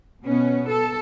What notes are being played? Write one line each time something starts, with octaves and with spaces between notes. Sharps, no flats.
B2 B3 C#4
A4